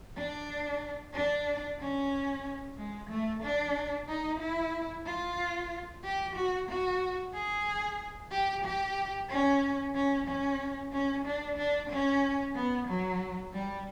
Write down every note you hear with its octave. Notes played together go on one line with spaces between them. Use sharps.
D4
D4
C#4
G#3
A3
D4
D#4
E4
F4
G4
F#4
F#4
G#4
G4
G4
C#4
C#4
C#4
C#4
D4
D4
C#4
B3
F#3
G3